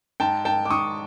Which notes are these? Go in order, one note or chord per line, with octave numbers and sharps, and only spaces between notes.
G#2 G5 A5
G#2 G5 A5
D6
G#2 C#6 D#6